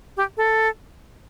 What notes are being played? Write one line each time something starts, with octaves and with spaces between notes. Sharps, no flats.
G4
A4